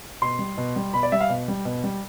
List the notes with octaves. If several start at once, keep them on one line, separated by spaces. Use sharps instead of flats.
B2 C6
G3
B2
G3
B2 B5
D5
G3 E5
F5
B2
G3
B2
G3